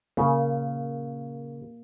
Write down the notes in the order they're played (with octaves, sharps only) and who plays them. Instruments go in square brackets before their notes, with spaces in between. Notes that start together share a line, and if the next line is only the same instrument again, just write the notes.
[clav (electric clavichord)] C#3 [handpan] A#3